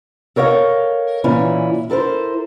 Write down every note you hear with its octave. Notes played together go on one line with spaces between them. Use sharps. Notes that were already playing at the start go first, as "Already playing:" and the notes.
A4 A#4 C#5 D#5 F5
A#2 E3 C#4 E4
E4 A4 A#4 C5